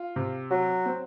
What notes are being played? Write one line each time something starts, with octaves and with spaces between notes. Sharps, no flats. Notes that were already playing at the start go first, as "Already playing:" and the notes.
Already playing: F4
C3
F#3 F#4
C4